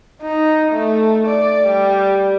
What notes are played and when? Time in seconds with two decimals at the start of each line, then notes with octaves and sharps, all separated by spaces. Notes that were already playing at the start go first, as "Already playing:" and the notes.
0.22 D#4
0.71 A3
1.27 D5
1.67 G3